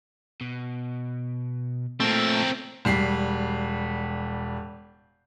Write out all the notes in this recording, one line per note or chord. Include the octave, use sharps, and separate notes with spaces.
B2
A#2 A3 C4 A#4 E6
E1 G3 C7